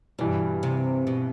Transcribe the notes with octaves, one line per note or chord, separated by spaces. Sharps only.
G2 B2 E3 G3
C3
B2